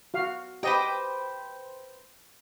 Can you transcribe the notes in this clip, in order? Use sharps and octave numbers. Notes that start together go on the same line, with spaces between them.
F#4 F5
G4 B4 C5 D#5 G5